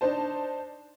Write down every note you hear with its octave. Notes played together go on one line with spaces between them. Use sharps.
D4 D#4 C5 A5